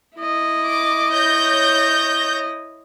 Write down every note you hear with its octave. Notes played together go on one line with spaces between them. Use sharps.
E4 D#5
D6
C#5 G6 A#6